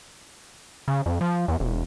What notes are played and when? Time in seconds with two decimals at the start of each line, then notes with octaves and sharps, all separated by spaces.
0.88 C#3
1.06 F2
1.21 F3
1.48 E2
1.60 E1